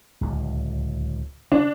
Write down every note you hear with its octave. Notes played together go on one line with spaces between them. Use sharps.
D1 C#2
C#3 D4